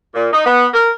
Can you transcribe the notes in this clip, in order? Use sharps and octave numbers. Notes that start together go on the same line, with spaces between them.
A#2
D#4
B3
A#4